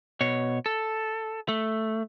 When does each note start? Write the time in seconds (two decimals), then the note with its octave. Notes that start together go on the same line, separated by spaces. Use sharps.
0.21 B2 C#5
0.66 A4
1.49 A3